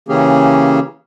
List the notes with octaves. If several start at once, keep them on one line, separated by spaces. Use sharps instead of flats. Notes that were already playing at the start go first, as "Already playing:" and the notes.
C#3 E3 A#3 C#4 G4 G#4